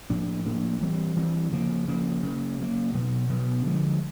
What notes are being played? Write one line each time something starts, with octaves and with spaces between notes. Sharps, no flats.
A2 F3 A#3 D4
A2 F3 A#3 D4
E3 G3 C4
E3 G3 C4
C#3 F3 A#3
C#3 F3 A#3
C#3 F#3 A#3
C#3 F#3 A#3
B2 F#3 B3
B2 F#3 B3
D3 F3 G#3